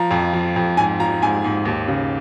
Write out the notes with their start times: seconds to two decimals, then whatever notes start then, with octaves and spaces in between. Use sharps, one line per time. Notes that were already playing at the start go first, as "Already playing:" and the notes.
Already playing: F3 A#5
0.11 F2
0.33 F3
0.56 F2
0.77 G#2 G#5
0.99 F3 A#5
1.22 G#2 G#5
1.44 G#2
1.65 D#2
1.88 C#3